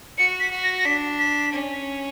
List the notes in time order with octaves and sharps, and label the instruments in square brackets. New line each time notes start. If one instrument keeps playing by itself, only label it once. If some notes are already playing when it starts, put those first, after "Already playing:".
[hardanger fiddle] F#4 [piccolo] C#7
[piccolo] B6
[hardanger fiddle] F#4
[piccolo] A#6
A#6
[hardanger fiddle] D4 [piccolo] B6
[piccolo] B6
[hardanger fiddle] C#4